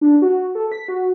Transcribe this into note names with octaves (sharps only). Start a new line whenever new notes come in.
D4
F#4
A4
B6
F#4